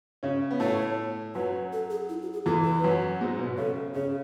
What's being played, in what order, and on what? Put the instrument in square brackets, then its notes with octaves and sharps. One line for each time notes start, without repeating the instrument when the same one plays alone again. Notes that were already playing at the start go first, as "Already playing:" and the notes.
[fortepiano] C#3 C#4
B3
[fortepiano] A2 A3 [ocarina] C#5
[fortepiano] F#2 F#3 [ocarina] B4
[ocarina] A4
G#4
E4
F#4
G#4
[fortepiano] E2 E3 [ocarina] A4
[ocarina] B4
[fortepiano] F#2 F#3
G#2 G#3
B2 B3
[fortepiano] C#3 C#4 [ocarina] A4
[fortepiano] C#3 C#4 [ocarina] G#4